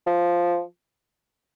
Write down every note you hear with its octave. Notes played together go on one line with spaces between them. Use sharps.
F3